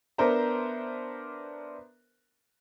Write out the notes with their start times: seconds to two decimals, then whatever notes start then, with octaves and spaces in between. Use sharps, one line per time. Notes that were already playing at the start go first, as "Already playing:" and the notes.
0.18 B3 D4 A#4 C5 E5 A#5